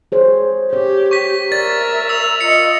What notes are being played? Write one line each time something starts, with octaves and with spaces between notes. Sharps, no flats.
G#4 C5 C#5
G4 C#5
C#6 B6
A#4 D5 E5 A6
E6 F7
F4 D#5 C#7